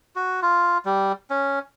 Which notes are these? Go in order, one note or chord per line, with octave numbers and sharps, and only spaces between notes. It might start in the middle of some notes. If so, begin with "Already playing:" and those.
F#4
F4
G3
C#4